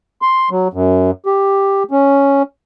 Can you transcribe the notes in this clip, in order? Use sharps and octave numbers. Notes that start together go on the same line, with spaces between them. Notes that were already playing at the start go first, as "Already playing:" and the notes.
C6
F#3
F#2
G4
C#4